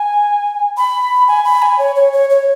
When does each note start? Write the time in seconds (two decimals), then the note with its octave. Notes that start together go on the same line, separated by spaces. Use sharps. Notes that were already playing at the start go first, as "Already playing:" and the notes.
Already playing: G#5
0.77 B5
1.28 G#5
1.44 B5
1.62 G#5
1.79 C#5
1.95 C#5
2.13 C#5
2.30 C#5